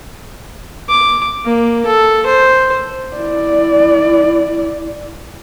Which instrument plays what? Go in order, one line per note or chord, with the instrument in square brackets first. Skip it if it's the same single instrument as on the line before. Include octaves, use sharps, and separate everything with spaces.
[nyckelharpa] D6
A#3
A4
C5
[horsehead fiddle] E4 D5